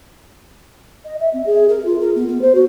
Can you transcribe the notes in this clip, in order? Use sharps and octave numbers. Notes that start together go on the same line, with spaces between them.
D#5
E5
C4
G#4
A#4
F4
A#4
B3
B3
C5
F#4